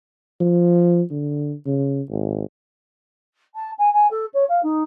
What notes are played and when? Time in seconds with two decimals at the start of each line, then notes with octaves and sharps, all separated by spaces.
0.40 F3
1.11 D3
1.66 C#3
2.10 G#1
3.55 A5
3.78 G#5
3.93 G#5
4.10 A4
4.33 C#5
4.49 F5
4.62 D#4